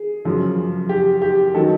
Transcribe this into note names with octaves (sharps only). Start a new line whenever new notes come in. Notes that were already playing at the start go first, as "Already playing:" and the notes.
Already playing: G#4
F#2 C#3 F3
G4
G4
D#3 F#3 A4